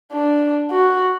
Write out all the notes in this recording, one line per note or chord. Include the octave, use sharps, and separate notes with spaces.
D4
F#4